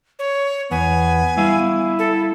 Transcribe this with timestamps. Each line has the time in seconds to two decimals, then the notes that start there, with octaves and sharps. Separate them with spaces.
0.19 C#5
0.71 E2 B3 G#5
1.37 G3 B3 E4 F5
1.99 A4